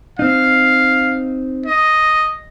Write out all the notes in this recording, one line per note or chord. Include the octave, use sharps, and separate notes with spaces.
C4 D#4 F5
D#5